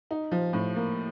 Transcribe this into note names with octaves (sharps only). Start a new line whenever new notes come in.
D#4
F3
A2
A#3